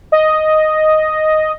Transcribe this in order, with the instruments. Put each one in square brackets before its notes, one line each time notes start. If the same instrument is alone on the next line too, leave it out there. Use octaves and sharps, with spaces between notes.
[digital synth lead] D#5